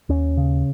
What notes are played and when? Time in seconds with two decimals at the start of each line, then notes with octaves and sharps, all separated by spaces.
0.09 D#2 C#4
0.37 C#3